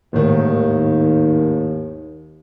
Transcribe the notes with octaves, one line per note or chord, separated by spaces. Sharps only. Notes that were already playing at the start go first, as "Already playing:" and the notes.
G#1 D#2 A2 D#3